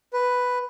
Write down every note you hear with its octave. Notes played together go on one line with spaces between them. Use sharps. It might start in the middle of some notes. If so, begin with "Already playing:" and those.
B4